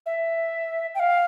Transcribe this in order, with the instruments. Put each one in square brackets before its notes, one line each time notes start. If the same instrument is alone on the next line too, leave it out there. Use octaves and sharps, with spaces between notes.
[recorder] E5
G5
F5